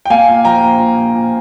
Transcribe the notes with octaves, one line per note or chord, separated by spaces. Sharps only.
G5
A#3 F5 G#5
A#2
F3 G5 A#5
A#1
A#2
A#2
A#2